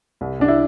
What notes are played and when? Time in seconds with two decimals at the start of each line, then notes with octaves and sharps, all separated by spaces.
0.21 C2
0.39 C2 D4
0.48 E4